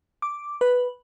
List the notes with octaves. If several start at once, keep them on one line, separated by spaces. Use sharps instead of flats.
D6
B4